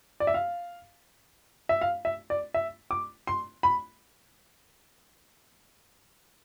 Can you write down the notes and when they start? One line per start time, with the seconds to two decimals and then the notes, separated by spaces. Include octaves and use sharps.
0.20 D5
0.27 E5
0.34 F5
1.69 E5
1.81 F5
2.05 E5
2.30 D5
2.54 E5
2.91 D6
3.27 C6
3.63 B5